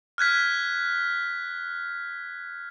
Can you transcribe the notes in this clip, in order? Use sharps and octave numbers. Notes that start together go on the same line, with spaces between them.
F6 F#6 G#6 B6